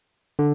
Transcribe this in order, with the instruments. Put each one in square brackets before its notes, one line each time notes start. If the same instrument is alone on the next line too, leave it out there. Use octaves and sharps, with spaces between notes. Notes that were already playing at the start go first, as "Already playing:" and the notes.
[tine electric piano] D3